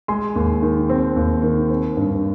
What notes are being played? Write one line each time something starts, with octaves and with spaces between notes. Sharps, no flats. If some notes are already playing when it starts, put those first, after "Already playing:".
G#3 G#5 C6
D#2
D#3
C4
D#2
D#3
C4
G2